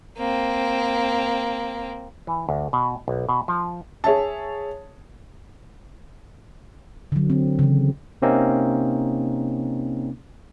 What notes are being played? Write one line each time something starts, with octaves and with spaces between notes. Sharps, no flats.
A#3 C4
E3
D2
B2
B1
B2
F3
G#4 C#5 E5 A5
D3 F#3
C4
C#3 E3
C3 A#3 C4 C#4 D#4